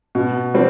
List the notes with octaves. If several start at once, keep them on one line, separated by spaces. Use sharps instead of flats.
B2
G3 C4